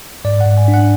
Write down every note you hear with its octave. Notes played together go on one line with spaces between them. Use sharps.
G#2 D5
F#5
G#2
G#5
D4
F#5